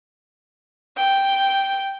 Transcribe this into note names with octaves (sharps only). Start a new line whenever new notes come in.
G5